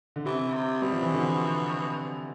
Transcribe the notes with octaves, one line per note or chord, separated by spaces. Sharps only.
D3
C3 E3
C3
B2 G3
F3
E3
D3 F3